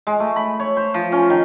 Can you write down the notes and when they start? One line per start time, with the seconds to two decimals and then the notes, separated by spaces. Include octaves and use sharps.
0.07 G#3
0.20 A3
0.36 B5
0.60 C#5
0.77 C5
0.94 F3
1.12 C#4
1.30 D#3